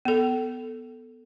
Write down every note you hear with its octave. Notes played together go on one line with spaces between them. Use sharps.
B3 A4